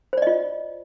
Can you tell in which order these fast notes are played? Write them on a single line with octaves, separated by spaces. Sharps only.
C5 D5 D#5 F4